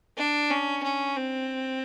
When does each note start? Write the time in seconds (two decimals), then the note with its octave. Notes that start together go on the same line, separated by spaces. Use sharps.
0.18 D4
0.50 C#4
0.84 C#4
1.16 C4